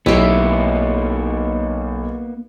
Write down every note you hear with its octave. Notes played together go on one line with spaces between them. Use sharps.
B1 A#3 B3 E4 G4